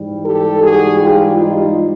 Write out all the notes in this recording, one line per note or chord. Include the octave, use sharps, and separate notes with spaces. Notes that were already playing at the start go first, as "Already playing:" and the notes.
Already playing: G#2 E3 G3
G4 A4
F#4 G#4
F4 G4
D#4 F4